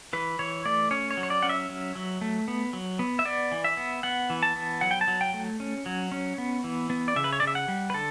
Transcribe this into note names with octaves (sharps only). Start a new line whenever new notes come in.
E3 B4
E3 C#5
A3 D5
C#4 C#5
C#5
F#3
C#5
D5
C#4 F#5
E5
F#3
F#3
A3
B3
F#3
B3
E5
B3 D5
E3
E5
B3
B3 F#5
E3
A5
B3
F#3 F#5
G5
A5
F#3
G5
A3
C#4
F#3
C#4
B3
E3
B3
D5
C#3 E5
B4
C#5
D5
C#3 E5
F#5
G3
B4
D3 A4